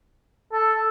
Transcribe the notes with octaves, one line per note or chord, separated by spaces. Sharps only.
A4